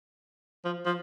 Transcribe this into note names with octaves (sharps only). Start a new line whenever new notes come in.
F3
F3